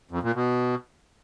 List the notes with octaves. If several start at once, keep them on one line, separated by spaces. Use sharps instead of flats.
F2
A#2
B2